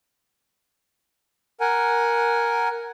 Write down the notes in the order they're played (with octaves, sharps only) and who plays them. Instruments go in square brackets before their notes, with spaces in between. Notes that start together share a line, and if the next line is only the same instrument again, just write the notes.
[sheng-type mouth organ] A#4 F#5 G#5